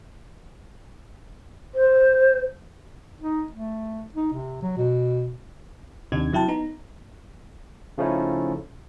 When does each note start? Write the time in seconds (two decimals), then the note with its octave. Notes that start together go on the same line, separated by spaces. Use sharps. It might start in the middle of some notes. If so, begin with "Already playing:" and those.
1.74 C5
3.21 D#4
3.52 A3
4.14 D#4
4.33 C3
4.62 F#3
4.77 B2
6.12 D#2 C3 D4 D#4 G#6
6.32 C3 F#3 E4 G5 A5
6.48 B3 D#4 A#5
7.98 C#3 F3 A3 C#4 D#4 E4